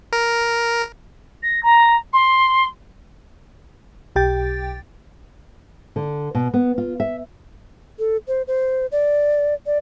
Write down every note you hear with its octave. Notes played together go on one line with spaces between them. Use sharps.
A#4
A#6
A#5
C6
B1 G4 G5 A6
D3
B2
B3
F4
E5
A4
C5
C5
D5
D5